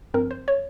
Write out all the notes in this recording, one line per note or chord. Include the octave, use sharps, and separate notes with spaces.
G2 F3 C4 A#4
C5
C#5